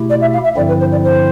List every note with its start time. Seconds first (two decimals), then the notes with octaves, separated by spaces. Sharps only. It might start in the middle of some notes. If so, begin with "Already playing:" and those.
Already playing: B2 A3 E4 G4
0.10 D5
0.21 E5
0.33 F5
0.44 E5
0.56 G2 D3 F3 C4 E4 D5
0.68 B4
0.80 C5
0.92 D5
1.04 C5